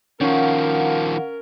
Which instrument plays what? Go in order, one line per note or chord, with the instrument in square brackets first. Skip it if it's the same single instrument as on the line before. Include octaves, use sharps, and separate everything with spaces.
[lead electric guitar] D#3 F3 [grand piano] C#4 [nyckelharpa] A#4 [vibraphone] F5 F#5